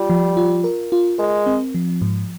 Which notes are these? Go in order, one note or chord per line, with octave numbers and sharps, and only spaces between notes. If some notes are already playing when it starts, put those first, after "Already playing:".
Already playing: G3 F4
F3
F4
A#4
F4
G#3 A#4
C4
F3
G#2